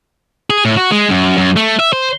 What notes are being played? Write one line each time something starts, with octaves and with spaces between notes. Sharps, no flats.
G#4
A2
F#4
G#3
F#2
F#2
A3
E5
C5